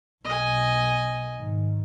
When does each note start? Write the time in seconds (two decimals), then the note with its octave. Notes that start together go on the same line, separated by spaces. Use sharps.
0.25 B1 D#5 G#5
1.36 G#2 D#3